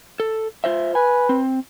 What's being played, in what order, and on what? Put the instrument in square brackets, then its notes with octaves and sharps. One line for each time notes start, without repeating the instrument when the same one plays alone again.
[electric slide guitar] A4
F4 C5 E5
[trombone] B4 [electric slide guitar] G#5
[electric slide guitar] C4